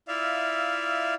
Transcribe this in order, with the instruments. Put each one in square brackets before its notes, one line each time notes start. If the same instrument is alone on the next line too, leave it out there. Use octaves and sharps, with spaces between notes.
[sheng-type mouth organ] E4 F4 D5 E5 F5